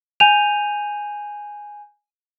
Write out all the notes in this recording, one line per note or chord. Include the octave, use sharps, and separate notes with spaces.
G#5 G6 D#7 F7